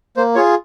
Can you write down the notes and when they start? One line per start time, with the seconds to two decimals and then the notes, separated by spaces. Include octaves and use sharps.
0.17 A#3 C5
0.35 F4 G#4 C#5